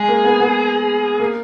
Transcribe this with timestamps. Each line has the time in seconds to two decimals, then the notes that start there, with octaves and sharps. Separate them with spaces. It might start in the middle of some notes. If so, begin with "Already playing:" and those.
Already playing: G#3 G#4
0.09 A#3
0.25 B3
0.40 B3
1.20 A#3